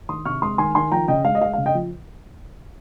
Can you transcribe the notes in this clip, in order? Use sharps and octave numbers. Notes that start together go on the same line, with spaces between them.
D#3 C6 D#6
C3 C#6 F6
G#3 C6 D#6
D#3 G#5 C6
D#3 G#5 C6
F3 G5 A#5
C#3 D#5 G5
G#3 F5
D#5
G#3 F5
F5
C#3
D#5 G5
F3